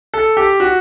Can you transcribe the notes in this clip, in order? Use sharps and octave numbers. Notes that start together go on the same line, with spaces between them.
A4
G4
F#4